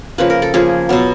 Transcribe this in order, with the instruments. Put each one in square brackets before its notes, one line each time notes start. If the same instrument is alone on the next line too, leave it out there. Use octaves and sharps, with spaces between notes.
[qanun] C#3 F3 A#3 B4
A#4
A4
C#3 F3 A#3 G#4
B2 F#3 B3